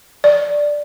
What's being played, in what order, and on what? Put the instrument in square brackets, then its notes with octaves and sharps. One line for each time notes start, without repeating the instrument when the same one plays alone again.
[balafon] D5